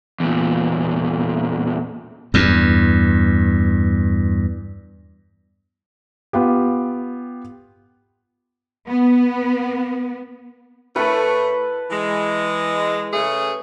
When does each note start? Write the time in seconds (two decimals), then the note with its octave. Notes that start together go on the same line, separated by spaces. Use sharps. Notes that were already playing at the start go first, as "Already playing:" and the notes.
0.20 E2 A#2
2.34 E2 G2
6.33 B3 F4 G4
8.87 B3
10.96 A2 A3 B4 A5
11.90 E3 G#3
13.13 C#3 A3 G#4